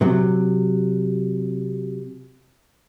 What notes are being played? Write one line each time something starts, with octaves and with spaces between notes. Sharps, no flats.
C3 F#3